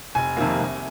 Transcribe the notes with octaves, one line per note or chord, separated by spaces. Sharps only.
F1 G#5
F2 C3 D#3 A#3
C2